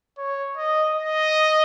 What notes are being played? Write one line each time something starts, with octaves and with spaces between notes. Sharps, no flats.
C#5
D#5
D#5